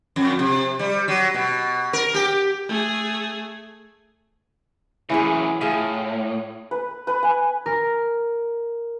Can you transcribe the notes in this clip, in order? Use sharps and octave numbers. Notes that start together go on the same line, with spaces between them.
F2
C3
G3
F#3
B2
A#4
G4
A3 G#4
F#2 A2 E3 E4 G#4
A2 F4 G#4 E5
B4
B4
G#5
A#4